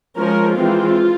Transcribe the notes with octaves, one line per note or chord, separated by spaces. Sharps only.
F3 G#3 C#4 A#4
E3 G#3 C4 F4